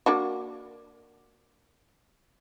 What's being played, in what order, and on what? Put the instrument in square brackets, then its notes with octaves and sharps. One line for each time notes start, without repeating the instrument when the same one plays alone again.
[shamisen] A#3 D4 F#4